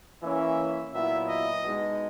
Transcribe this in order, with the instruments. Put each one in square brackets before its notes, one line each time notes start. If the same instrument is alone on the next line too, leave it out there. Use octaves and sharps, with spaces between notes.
[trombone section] E3 A#3 C#4 [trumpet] E5
[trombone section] A#2 F#3 B3 E4 [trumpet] E5
[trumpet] D#5
[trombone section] B2 G#3 D#4